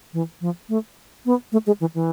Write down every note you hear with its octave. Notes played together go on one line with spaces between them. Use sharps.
E3
F3
A3
B3
A3
G#3
E3
E3